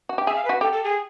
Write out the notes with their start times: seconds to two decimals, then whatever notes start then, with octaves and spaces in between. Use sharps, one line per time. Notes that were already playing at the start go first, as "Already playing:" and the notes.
0.09 F#4
0.18 G4
0.27 G#4 E5
0.36 F5
0.45 B4
0.49 F#4
0.61 G4 A4
0.72 A4
0.84 G#4